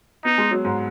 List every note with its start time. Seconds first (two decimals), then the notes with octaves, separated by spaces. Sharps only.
0.25 B3 D#4
0.38 G#3
0.51 F#3
0.65 G#2